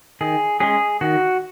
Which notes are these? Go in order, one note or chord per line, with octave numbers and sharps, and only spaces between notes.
D#3 G#4
G#3 C#4 G#4
D#3 F#4